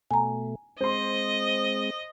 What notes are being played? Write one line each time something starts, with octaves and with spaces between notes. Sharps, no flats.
B2 A3 G#5 A#5
G#3 C4 C5 D#5 C6